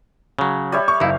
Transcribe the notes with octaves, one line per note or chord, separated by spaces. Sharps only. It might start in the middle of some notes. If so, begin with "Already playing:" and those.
C#3 F#3
G3 C#5 E5
C#6
F#1 D#4 E4 F5